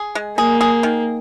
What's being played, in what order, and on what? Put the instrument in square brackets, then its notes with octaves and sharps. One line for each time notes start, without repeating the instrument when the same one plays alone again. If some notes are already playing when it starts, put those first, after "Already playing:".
Already playing: [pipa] G#4
G#3
[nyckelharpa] A#3 [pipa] G#4
[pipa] G#4
D#3